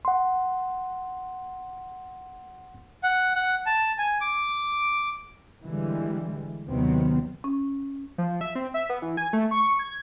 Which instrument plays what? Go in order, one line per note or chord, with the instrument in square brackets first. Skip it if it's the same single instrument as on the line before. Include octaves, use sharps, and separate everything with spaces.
[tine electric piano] F#5 C6
[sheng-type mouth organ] F#5
F#5
A5
G#5
D6
[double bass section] D3 E3 G3 G#3
D#2 C3 D#3 F#3 B3 C4
[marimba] C#4
[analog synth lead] F3
E5
C4
E5
B3
E3
G#5
A3
C#6
G#6